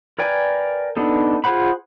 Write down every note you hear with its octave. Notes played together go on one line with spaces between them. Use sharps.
A#4 B4 D5 G5 G#5
B3 D4 D#4 A4
F4 G#4 C5 F#5 B5